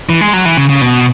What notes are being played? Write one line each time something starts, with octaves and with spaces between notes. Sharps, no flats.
E3
G#3
F#3
E3
C#3
C#3
B2